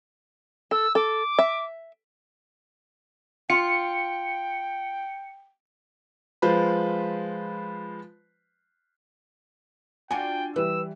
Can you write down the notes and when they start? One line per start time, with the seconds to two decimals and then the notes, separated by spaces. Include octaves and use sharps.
0.71 A4 E6
0.95 A4 D6
1.39 E5
3.50 F4 G5 C#7
6.42 F3 G#3 F4 B4 C5 B5
10.11 D4 F4 F#4 G5 G#5
10.56 E3 G3 B4 E6